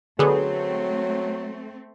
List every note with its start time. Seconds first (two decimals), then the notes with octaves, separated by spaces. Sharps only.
0.19 D3 F#3 A3 B3 C4 G#4